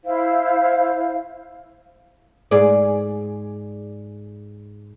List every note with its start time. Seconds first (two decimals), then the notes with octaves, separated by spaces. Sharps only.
0.05 E4 C5 F5
2.51 G#2 G#4 D5